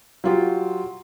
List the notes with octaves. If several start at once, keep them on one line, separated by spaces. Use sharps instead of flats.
F#3 F4 G4